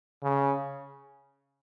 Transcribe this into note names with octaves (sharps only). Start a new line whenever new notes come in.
C#3